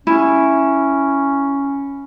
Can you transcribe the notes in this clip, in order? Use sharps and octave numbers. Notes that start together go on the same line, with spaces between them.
C#4 E4 B5